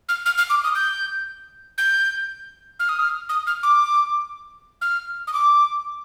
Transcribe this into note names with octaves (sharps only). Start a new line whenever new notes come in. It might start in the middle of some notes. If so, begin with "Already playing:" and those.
F6
F6
F6
D6
D#6
G6
G6
F6
D#6
F6
D#6
F6
D6
F6
D#6
D6